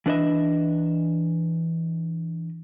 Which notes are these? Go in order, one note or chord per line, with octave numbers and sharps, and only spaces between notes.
E3 D4 B4 D#5 E5